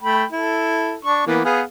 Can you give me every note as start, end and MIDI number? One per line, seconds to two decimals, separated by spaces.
0.03 0.24 57
0.03 0.24 79
0.03 0.24 83
0.32 0.96 64
0.32 0.96 69
1.05 1.23 62
1.05 1.23 85
1.27 1.42 52
1.27 1.42 58
1.27 1.42 59
1.45 1.62 59
1.45 1.62 68
1.45 1.62 77